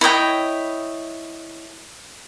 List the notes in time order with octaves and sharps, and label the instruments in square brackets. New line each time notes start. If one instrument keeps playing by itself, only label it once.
[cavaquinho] E4 C#5 D#5 G5